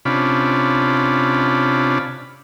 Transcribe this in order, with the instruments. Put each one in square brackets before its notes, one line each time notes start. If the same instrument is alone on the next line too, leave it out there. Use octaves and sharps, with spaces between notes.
[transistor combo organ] C3 C#4 D4 F4 B5